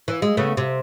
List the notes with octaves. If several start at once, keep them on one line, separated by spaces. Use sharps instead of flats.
E3
G#3
C#3 A3 B3
C3